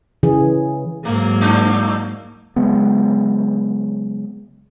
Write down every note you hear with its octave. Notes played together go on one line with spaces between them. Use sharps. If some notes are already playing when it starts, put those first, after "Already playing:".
C#3 E3 G#4
G#2 F#3 A3 A#3
G2 D4 D#4
C#3 F#3 G#3 B3